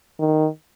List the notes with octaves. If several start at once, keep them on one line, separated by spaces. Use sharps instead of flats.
D#3